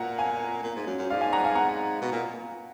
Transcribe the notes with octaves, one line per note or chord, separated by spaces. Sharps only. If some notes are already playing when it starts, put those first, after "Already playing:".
Already playing: A#2 F#5 A#5
F5 G#5
A#2
G#2
F#2
F#2
G#2 D5 F5
F5 G#5
F#5 A#5
F5 G#5
F#5 A#5
B2
A#2